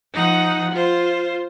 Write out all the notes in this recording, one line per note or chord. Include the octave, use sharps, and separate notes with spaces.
F3 D#4 F#5
F4 C5